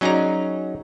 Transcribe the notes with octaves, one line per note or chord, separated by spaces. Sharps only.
F#3 C#4 D#4 G#4 D5 A#5